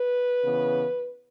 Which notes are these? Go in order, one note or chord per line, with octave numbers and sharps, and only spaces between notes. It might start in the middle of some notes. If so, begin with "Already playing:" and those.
Already playing: B4
C#3 E3 B3